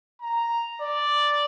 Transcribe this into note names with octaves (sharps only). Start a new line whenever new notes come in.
A#5
D5